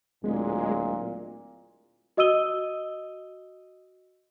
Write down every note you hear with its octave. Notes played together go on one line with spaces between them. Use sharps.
D1 A#2 G#3
F#4 D#5 D#6 E6 D#7 G7